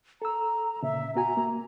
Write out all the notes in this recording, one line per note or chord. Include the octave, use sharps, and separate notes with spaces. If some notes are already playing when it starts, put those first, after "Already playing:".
A4 A#5 E6
A#2 C#3 E5
B3 F#4 G#5 A#5
A#3